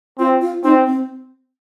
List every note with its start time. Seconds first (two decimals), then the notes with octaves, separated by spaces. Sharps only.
0.18 C4 F4
0.41 F4
0.64 C4 D#4
0.87 C4